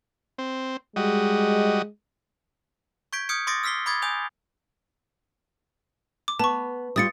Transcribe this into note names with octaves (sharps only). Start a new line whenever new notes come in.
C4
G3 G#3 F#4 D#5
C#6 G6 G#6 B6 D7
D#6 F6 G6 G#6 C#7 D7
C6 D6 D#6 A6 A#6 D7
E6 F6 B6 C7 G7
B5 D6 D#6 G#6 A6
G#5 D#6 G6 F7
D6
B3 A5 C#6
G3 E4 F4 D#6 A6 C#7